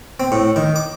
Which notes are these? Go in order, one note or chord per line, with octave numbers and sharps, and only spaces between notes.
C4
A2
D#3
D6